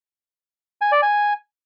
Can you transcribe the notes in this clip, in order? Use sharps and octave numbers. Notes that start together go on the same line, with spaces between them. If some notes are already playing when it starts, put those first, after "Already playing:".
G#5
D5
G#5